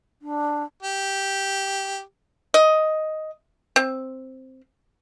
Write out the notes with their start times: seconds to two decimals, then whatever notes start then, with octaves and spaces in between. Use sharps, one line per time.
0.22 D4
0.83 G4
2.54 D#5
3.76 C4